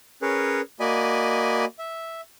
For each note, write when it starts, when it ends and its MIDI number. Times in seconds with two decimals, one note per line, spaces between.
0.22 0.61 61
0.22 0.61 68
0.22 0.61 70
0.22 0.61 71
0.22 0.61 73
0.80 1.65 58
0.80 1.65 66
0.80 1.65 74
0.80 1.65 75
0.80 1.65 80
0.80 1.65 83
1.79 2.21 76